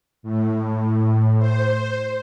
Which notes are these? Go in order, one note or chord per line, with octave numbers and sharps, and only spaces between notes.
A2
C5